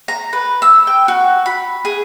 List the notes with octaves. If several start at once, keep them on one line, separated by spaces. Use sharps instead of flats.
A#5
B4
E6
G5
F#4
B5
G#4